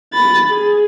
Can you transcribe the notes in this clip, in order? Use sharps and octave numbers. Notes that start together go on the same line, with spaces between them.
B5 A6
G#4